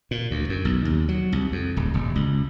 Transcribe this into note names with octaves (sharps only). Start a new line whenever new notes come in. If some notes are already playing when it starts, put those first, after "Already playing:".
A#2
D2
F#2
B1
D#2
F#3
C2
F2
D1
D#1
C#2